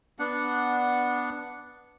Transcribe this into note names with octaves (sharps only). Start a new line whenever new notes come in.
B3 D4 F#5